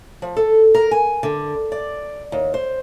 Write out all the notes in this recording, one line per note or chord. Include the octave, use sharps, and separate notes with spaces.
F3
A4
A#4
G#5
D3
D5
D#2
C5